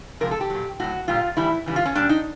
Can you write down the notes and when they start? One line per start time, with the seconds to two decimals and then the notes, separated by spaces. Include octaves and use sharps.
0.20 C3 F3 G#3 A#4
0.31 A4
0.41 G4
0.50 A#2 F#3
0.80 A2 F#3 F#4
1.08 A#2 G3 F4
1.37 A2 E3 G3 E4
1.66 C#3 E3 G3
1.76 F4
1.86 C#4
1.95 A#2 G3 D4
2.09 D#4